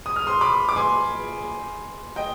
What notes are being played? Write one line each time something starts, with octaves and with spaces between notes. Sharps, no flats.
D#6
F6
C6 D#6
B5 D6
D6
G#5 C6
D#5 G5